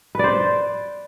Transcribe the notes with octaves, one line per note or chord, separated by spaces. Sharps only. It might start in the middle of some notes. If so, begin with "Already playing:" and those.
B4 C5 D5